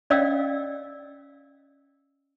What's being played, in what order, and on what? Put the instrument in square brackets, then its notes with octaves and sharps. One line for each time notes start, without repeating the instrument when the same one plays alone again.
[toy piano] C#4 D5 D#5 F5 G5 E6